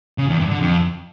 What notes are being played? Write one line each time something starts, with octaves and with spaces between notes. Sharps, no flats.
C#3
E2
G2
D3
F2